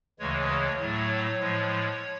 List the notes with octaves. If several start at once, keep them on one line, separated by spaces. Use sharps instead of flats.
D2 C#3 E3 G#3 C#5
A2 F#3 A3 C#5
A2 F3 G#3